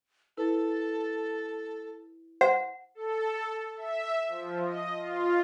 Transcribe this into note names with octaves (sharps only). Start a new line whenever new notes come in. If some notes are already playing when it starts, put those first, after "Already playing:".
E4 A4 B4
C5 F#5
A4
E5
F3
D#5
F4